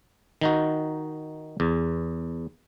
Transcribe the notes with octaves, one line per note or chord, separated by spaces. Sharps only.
D#3 D#4 F#4
E2